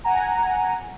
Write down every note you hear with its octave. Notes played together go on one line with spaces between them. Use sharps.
F#5 G#5 A#5